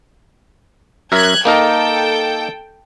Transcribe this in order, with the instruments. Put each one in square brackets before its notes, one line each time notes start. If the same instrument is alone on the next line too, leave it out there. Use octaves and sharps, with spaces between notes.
[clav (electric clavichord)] F#2 A#4 E5 [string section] F#6 G#6
[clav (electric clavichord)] A#3 D#4 A#4 [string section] A4 G5